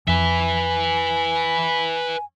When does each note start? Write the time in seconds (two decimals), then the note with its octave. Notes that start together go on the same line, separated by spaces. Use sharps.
0.08 F2 B4 E5 G#5